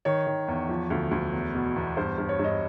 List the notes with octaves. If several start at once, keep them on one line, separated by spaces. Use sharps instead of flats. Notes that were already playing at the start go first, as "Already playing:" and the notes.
D#3 C#5
D#3
E2
F3
D2
D2
E2
B2
E2
G2 C5
G2
C#5
G2 D#5